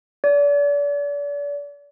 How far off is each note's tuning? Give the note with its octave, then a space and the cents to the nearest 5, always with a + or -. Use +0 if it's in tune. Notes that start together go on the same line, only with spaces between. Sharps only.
D5 -35